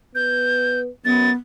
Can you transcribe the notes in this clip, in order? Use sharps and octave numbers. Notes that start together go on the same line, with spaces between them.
B3 G6
F#2 B3 A6